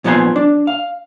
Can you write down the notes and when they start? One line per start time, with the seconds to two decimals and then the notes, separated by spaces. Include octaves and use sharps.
0.04 A#2 F3 B3 D5 G#5 C6
0.36 D4
0.67 F5